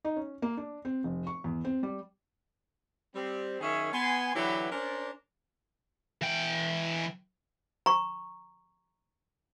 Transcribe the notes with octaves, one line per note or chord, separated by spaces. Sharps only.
D#4
C#4
A#3
D4
C4
F1
C#6
E2
C4
G3
G3 C4
F#2 D#3 C#4 G#4 C#5 E5
B3 G#5 C6
D3 E3 F#3 E4 G4 B4
C#4 D4 A#4 C5 D5
E3 G5
A#5 C#6